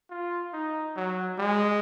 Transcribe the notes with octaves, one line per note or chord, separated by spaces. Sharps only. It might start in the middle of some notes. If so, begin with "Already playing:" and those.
F4
D#4
F#3
G#3